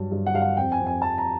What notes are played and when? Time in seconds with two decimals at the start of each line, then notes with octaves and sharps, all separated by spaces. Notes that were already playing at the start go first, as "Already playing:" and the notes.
Already playing: G2 F#3
0.11 G2
0.26 F#5
0.34 G2 F5
0.42 F#5
0.57 F2 G5
0.72 G#5
0.80 F2
0.87 G#5
1.02 F2 A5
1.18 A#5